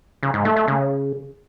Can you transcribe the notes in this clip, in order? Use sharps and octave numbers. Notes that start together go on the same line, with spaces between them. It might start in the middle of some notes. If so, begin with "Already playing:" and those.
C#3
G#2
A3
A3
C#3